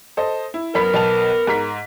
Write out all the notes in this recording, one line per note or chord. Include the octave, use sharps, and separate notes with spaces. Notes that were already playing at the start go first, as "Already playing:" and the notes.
A4 C5 D#5
E4
F#2 B3 A#4 B5 B6
B1 A5 F7
G#2 A#5 B6